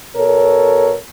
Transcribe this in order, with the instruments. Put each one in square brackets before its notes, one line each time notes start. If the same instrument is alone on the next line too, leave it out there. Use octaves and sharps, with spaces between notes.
[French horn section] B2 A4 A#4 C#5